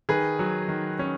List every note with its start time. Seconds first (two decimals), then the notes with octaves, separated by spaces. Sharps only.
0.09 D#3 G#4 B4
0.39 F#3
0.68 D#3
0.99 C#4